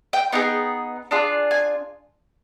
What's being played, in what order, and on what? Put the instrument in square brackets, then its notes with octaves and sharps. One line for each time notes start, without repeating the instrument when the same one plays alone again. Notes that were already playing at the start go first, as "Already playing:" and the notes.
[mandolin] G5
B3 D#4 G#4 G5
D4 F4 G#4
G#5